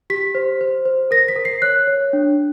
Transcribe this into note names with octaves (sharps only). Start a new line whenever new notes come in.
G4 B6
C5
C5
C5
A#4 A#6
B6
A#4
C7
C#5 F#6
C#5
D4